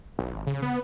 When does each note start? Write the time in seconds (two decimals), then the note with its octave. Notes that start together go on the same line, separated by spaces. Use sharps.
0.19 B1
0.34 G#1
0.47 C#3
0.62 B3